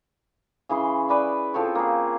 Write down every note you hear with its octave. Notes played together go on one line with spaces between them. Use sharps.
C#3 E3 G#4 C6
B4 D5 E5
F3 C4 A4 C#5
A#3 G#4